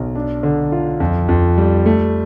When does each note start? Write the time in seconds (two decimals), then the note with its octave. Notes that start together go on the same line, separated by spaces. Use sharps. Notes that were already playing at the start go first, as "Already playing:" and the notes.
Already playing: B1
0.15 D4
0.43 D3
0.72 F4
1.00 F2
1.29 F2
1.58 G3
1.86 A3